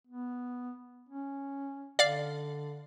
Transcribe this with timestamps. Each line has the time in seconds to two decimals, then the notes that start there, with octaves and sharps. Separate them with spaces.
0.07 B3
1.09 C#4
1.99 D3 D5 F5